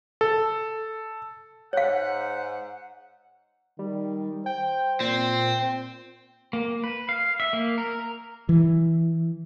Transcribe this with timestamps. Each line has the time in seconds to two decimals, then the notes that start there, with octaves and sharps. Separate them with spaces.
0.21 A4
1.73 G#2 C#5 F5 F#5
3.79 D#3 G3
4.46 C5 G5
5.00 A#2 C4
6.53 A#3
6.84 B4
7.09 F5
7.40 E5
7.53 A#3
7.78 A#4
8.49 E3